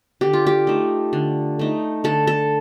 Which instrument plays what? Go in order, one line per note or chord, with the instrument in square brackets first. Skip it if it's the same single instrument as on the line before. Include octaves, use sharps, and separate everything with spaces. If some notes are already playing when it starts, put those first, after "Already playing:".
[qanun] D3 G4
F4
G4
A3 D#4
D3
A3 D#4
D3 A4
A4